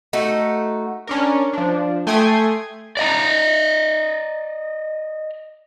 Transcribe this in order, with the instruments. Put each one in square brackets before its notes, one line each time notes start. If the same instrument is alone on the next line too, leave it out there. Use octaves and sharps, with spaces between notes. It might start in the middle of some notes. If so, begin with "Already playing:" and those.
[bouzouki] A3 D#4 F#4
[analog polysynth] C#4 D4 A#4
F3 D4
A3 G5 G#5 C6 D#6 G#6
[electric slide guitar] D5 D#5 A#5